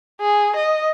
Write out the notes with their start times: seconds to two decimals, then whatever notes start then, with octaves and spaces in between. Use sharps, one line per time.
0.21 G#4
0.56 D#5